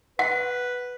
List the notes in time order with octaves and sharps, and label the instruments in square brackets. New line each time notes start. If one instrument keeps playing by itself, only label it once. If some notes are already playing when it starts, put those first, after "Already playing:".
[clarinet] B4 [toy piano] F#5